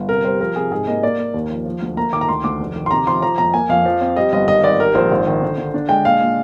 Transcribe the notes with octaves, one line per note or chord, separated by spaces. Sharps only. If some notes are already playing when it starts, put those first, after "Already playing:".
Already playing: G1
C3 A#4
G3 C5
F3 A#4
C3 G#4
G#2 G#4
A#3 D#5
A#3 D5
A#3
D#2
F3
F3
D2
A#3 A#5
D#3 D6
A#5
D2 C6
D2 D6
F1
D#3
C6
C3 A#5
F3 C6
F3 A#5
F2 A#5
A#3 G#5
F2 F5
F3
C4
G3 D#5
G1 D#5
G#1 D#5
G#1 D5
G3 A#4
A#1 C5
G#1
D#3
D3
D3
D4
G#3 G5
A#2 F5
A#2